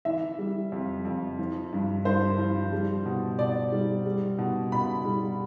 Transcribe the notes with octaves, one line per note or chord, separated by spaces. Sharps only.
E3 E5
G3
F2
F2
F3
G2
G2 C5
F3
G3
B2
B2 D5
G3
G3
B2
B2 B5
G3